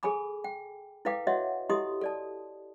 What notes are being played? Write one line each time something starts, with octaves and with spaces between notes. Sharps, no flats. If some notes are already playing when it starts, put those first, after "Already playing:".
G#4 A4 G#5 B5 D6
G5
E4 A4 B4 F5 G5 D6
F#4 C#5 D#5 E5 F#5
E4 G4 A4 D#5 C6 D#6
A4 D5 A5